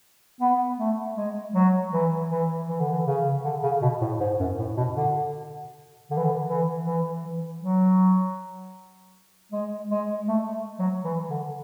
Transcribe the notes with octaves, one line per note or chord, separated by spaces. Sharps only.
B3
A3
G#3
F#3
E3
E3
E3
D3
E3
C#3
D3
C#3
B2
A2
G#2
F#2
A2
B2
D3
D3
E3
D3
E3
E3
E3
F#3
G#3
G#3
A3
F#3
E3
D3